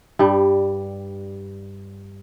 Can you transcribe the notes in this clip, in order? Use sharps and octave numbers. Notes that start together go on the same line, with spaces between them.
G2 G3